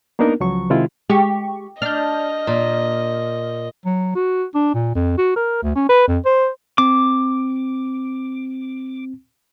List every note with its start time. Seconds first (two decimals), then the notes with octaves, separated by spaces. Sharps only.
0.19 A#3 B3 D4 D#4 A#4
0.40 C#2 F3 F#3 C#6
0.70 C3 D#3 G#3 E4 F4
1.10 G#3 G4 C#6
1.82 D4 D#5 F6 G6
2.47 A#2
3.85 F#3
4.16 F#4
4.55 D4
4.74 A#2
4.95 F2
5.18 F#4
5.36 A#4
5.63 D2
5.76 C#4
5.89 B4
6.08 F2
6.25 C5
6.78 C4 D6